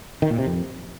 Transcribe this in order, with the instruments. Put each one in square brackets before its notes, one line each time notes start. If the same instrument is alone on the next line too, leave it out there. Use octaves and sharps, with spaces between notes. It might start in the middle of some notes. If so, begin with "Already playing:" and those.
[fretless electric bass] D#3
A#2
C3
F2